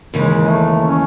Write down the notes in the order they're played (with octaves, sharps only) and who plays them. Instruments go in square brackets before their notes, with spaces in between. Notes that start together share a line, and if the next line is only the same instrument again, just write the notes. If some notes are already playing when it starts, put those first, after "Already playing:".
[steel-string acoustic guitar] D#2 C#3 E3 [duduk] G#3
[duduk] A3
C#4